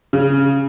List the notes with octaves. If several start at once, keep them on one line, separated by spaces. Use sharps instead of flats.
C#3